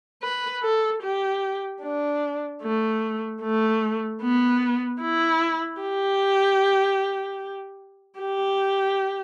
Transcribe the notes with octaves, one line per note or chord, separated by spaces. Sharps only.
B4
A4
G4
D4
A3
A3
B3
E4
G4
G4